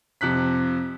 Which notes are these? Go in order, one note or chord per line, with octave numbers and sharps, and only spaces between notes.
F2 C3 F#6 B6